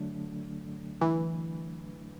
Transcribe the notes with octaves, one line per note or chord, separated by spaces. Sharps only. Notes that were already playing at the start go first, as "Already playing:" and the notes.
Already playing: D3 F#3 A3 D4
E3